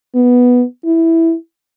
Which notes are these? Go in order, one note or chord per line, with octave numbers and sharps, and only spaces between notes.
B3
E4